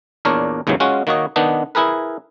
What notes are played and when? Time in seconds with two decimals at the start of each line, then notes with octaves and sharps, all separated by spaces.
0.25 E2 A#2 D4 A#4 C#5
0.67 D#2 G#2 C#3 E3 F#3
0.80 G#3 C#4 F4 F#4
1.07 D#3 A#3 F#4 C#5 D#5
1.36 D#3 B3 D4 D#4 B4
1.75 E4 G#4 A#4 B4